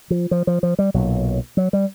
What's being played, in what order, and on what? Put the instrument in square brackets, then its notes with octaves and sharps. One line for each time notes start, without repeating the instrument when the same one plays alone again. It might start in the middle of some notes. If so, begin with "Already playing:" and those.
[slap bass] F3
F3
F3
F3
G3
B1 A#2 F#3
F#3
G3